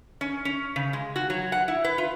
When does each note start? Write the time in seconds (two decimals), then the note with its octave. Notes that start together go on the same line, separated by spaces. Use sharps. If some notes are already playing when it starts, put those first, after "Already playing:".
0.21 C#4
0.45 C#4
0.76 C#3
0.93 G#3
1.16 F#4
1.30 F#3
1.52 F#5
1.68 E4
1.84 B4
1.98 F4